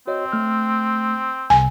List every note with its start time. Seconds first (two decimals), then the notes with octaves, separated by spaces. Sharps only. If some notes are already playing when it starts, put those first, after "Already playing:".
0.07 C4 F#4 C#5 D#5
0.32 A3 F6
1.50 C2 C3 G#5